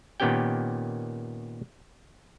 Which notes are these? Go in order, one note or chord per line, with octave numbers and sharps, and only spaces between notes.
A#2 D#3 B3 C#4 G4 G5